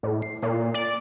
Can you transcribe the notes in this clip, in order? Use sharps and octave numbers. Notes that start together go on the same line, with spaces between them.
A2
C7
A#2
D5